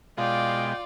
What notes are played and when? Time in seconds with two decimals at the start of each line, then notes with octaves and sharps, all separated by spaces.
0.18 B2 G#3 F4 D5 D#5 F5 G5